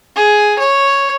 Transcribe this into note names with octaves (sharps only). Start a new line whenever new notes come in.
G#4
C#5